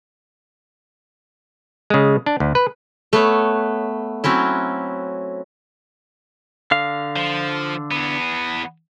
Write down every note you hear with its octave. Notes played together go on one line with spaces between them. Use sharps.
C#3 G#3
D4
D2
B4
A3 B3 C#5
F#3 C4 C#4 E4
D3 F5
F3
E2 B3